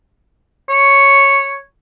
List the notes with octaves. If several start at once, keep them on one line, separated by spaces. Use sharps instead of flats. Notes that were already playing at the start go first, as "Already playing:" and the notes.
C#5